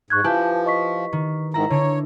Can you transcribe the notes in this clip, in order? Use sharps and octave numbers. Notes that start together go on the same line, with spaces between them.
G#2 C#6 F#6 G#6
F3 E4 G4 B4 G#5 A5 G6
D#5 C#6 B6
D#3
G#2 D#3 E4 A#5 A#6
D3 C#5